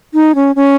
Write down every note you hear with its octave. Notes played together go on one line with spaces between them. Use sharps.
D#4
C#4
C#4